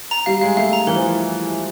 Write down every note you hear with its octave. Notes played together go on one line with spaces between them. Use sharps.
A#5
G3 F5
G#3 F5
A3 F5
A#5
E3 A#4
F3